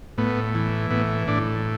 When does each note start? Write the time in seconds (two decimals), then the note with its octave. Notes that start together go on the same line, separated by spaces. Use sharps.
0.18 A2 B3
0.55 E3
0.91 A2 B3
1.28 A2 D4